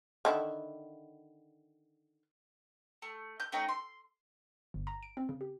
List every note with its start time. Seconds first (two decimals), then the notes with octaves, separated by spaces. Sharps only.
0.25 D3 D#3 E4
3.02 A3
3.40 G6
3.52 A3 C#4 D#4 G5
3.69 C6
4.74 G1
4.87 A#5
5.03 D7
5.17 C4
5.29 C#3
5.41 G4